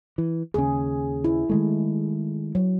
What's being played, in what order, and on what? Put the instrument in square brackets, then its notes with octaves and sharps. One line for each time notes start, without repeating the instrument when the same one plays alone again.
[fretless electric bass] E3
[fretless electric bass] D#2 C#3 [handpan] G#4
[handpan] E4
[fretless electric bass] D#3 G#3 A3
[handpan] F#3